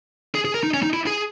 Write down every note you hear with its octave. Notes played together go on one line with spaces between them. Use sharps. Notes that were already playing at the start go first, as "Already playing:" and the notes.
G#4
G#4
A#4
D#4
C#4
D#4
E4
G#4